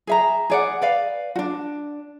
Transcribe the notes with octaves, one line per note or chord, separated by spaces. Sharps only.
G#4 E5 A#5
G#4 D5 F#5
B4 D5 F5
D4 F#4